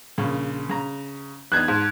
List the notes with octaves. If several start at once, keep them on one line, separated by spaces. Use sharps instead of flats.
A#1 C#3
C#3 A#5
E2 D4 D#4 F#6 G#6
G#2 A5